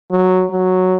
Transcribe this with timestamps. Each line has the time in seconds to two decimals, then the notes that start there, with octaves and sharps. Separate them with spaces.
0.11 F#3
0.50 F#3